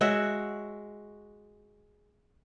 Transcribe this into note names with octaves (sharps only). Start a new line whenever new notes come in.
G#3 F#4 C#5 E5